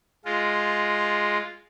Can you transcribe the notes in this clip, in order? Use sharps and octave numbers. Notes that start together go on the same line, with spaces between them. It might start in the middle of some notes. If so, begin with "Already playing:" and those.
G#3 F4